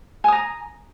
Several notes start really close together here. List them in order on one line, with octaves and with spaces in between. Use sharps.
G#5 D#6 A#5